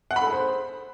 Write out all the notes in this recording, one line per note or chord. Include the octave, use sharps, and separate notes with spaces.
F#5
B5
A4
G#4
C5